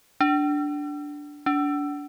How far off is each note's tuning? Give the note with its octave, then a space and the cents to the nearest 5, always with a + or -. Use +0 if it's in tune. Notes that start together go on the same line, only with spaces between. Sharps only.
D4 -5
D4 -30